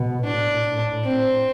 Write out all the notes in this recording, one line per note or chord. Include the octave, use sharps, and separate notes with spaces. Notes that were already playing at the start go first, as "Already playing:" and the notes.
Already playing: B2
A2 D4
C4